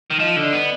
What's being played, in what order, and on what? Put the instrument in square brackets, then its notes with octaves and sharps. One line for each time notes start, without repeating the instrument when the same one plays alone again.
[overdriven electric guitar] D#3
[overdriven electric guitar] F3 [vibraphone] D#5
[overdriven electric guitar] D3
[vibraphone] D5
[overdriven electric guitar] B3